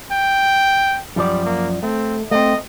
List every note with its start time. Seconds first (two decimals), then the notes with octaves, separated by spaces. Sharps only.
0.12 G5
1.16 F#2 F3 G3 D5
1.46 A#3
1.83 A3 C4
2.31 A3 C4 D#5